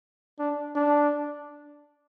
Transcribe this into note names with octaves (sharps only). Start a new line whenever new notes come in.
D4
D4